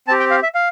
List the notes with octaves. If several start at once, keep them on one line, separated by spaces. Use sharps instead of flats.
C4 G4 A5
G5
F5
E5
F5